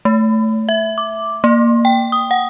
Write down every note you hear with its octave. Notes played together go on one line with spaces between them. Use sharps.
A3
E5
D6
A#3
G5
D#6
F#5